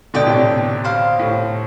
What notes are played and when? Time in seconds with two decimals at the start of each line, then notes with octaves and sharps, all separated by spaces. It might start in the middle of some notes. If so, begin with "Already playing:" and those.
0.14 B2 D3 D5 G5 D6
0.26 A2 C3
0.38 B2
0.84 G4 C5 F5 B5
1.19 A2